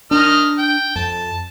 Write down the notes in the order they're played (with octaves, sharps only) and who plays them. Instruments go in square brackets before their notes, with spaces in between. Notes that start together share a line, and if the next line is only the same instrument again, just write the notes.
[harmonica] D#3 D#5 F6 [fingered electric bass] D4
[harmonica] G5
[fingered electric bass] F2 [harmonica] A5